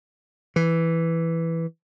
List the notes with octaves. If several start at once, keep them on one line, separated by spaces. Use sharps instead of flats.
E3